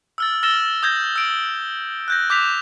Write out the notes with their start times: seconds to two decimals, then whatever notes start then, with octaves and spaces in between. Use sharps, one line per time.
0.18 E6 F6 A6
0.43 E6 F6 A6 A#6 E7 G7
0.83 D#6 G6 G#6 A#6
1.16 E6 D7 G7
2.08 F#6 G6 A#6
2.30 D6 G6 B6 F7